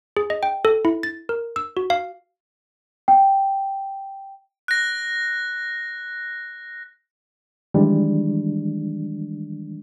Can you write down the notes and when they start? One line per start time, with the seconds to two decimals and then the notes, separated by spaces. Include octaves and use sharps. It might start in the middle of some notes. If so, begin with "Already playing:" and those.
0.17 G#4
0.30 D#5
0.43 G5
0.65 A4
0.85 E4
1.03 A6
1.29 A#4
1.56 E6
1.77 F#4
1.90 F5
3.08 G5
4.68 F#6 A#6
7.74 D#3 E3 G3 G#3 D4